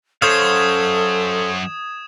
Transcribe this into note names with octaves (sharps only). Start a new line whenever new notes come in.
F#2 A4 C5 C#5 F5 D#6 G#6 E7